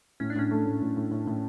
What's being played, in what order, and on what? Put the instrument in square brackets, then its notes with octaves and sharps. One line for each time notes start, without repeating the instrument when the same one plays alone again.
[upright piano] A2 [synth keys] C#4
[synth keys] D4
[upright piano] A2 [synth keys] C#4
[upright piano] A3
A2
A2
A2
A2
A2